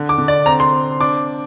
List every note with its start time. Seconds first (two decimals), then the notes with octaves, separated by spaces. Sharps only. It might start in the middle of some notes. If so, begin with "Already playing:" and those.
Already playing: D3
0.09 D6
0.18 D3
0.28 D5
0.46 C4 A#5
0.60 C6
0.73 C4
1.00 D4 D6